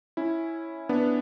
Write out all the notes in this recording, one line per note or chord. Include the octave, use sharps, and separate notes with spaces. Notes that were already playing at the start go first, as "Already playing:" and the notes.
C#4 E4
B3 D4